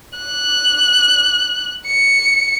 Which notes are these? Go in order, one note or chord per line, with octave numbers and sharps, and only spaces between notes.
F#6
C#7